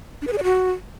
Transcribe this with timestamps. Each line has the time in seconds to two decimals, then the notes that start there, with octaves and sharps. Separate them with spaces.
0.22 D4
0.27 B4
0.33 G#4
0.38 D5
0.43 F#4